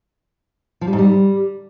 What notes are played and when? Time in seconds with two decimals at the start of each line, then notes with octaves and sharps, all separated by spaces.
0.81 F3
0.87 G3
0.93 G#2
0.98 G3